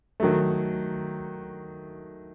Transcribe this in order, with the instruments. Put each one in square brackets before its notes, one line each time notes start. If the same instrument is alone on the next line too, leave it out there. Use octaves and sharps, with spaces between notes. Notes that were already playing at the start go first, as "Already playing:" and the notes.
[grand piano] D#3 F#3 A3